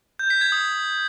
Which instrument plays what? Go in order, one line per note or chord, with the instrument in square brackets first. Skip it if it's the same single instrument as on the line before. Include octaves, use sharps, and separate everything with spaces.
[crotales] G6
B6
G#6
D#6